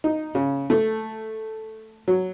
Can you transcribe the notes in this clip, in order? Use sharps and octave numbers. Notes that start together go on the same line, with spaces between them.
D#4
C#3
A3
F#3